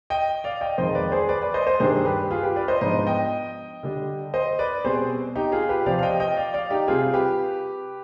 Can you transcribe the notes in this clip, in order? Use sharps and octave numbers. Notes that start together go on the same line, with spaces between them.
D#5 G5
D5 F5
D#5 G5
F2 D#3 G#3 C5 D#5
B4 D5
G#4 C5
B4 D5
B4 D5
C5 D#5
C5 D#5
G2 D#3 G3 D4 G#4 C5
G4 B4
F4 G#4
G4 B4
B4 D5
C5 D#5
G#2 F3 B3 D4 C5 D#5
D#5 G5
D3 G3 D4
C5 D#5
B4 D5
B2 G3 C4 G#4 C5
D#4 G4
F4 G#4
G4 B4
C3 F3 C4 D5 F5
F5
D#5 G5
D#5 G5
D5 F5
D5 F5
D#4 G4
C3 G3 C4 F4 G#4
G4 B4